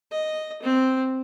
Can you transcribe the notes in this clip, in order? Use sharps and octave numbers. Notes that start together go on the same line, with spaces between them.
D#5
C4